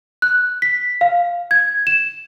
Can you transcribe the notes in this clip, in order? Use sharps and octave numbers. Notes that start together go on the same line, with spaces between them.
F#6
B6
F5
G#6
E7